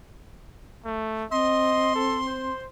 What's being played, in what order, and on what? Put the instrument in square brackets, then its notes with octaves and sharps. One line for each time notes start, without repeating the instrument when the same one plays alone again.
[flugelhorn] A3
[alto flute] C4 [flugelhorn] D#5 [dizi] C6
[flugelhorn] A4
C5